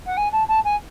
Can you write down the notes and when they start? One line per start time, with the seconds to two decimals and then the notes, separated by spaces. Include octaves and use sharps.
0.06 F#5
0.17 G#5
0.32 A5
0.48 A5
0.64 G#5